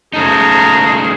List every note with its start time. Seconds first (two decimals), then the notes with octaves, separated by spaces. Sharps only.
0.13 C#3 A3 D#4 F#4 G#4 A5 A#5